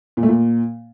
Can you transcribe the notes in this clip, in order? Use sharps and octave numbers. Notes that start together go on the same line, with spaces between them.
A#2
A3
A#2